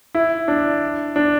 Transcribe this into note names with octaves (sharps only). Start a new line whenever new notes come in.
E4
D4
D4